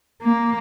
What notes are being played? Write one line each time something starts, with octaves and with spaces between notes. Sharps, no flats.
A#3